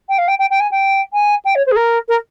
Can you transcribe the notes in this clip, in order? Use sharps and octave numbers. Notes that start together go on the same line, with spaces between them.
G5
F5
G5
G5
G5
G#5
G5
G#5
G5
C#5
C5
G#4
A#4
A#4